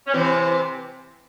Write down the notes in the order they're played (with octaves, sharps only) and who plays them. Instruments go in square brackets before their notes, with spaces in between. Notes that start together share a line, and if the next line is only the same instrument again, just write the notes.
[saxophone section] C#4
[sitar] C3 E3 [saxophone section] C4